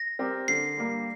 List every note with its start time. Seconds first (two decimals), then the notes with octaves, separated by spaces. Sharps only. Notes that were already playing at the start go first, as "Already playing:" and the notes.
Already playing: A#6
0.19 C4 G4 A#4
0.48 D3 C7
0.77 G3 A#3